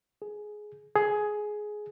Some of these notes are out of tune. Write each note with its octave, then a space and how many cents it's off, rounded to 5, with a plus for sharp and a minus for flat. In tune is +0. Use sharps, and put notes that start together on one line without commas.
G#4 +15
G#4 +15